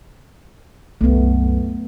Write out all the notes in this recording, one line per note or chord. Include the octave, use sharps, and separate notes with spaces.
C2 F#2 A3 B3